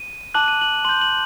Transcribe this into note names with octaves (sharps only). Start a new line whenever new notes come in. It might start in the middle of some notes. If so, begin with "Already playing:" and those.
Already playing: D#7
A5 D6 F#6 F#7
D#7
F#7
C6 G6 F#7
F#7